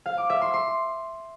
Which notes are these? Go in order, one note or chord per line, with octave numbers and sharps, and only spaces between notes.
F5
D6
E5
C6
C6